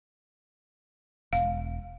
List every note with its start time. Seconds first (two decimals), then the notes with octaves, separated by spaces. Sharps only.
1.33 E1 F5